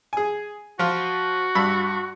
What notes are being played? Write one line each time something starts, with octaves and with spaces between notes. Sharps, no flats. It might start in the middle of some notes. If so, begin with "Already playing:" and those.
G#4 G#5
F3 F4 F#4
G2 B5 E6